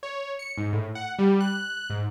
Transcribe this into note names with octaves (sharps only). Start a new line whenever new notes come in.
C#5
C#7
G#2
A2
F#5
G3
F#6
G#2